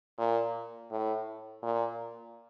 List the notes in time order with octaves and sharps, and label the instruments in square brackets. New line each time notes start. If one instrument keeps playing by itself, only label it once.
[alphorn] A#2
A2
A#2